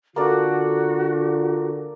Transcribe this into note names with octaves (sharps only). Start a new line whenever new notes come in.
D3 A#3 F4 F#4 A4 D5